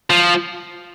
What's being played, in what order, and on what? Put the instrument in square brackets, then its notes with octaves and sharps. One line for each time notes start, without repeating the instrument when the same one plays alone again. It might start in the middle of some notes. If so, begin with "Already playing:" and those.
[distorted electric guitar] F3